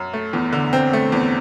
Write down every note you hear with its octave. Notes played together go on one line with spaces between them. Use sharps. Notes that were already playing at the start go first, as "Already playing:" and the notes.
Already playing: F#2
A3
E2
D3
C4
A3
E2